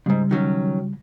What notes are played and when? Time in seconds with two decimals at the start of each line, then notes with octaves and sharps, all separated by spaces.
0.06 F2 G#2 C#3 G3
0.31 D#3 F#3 C#4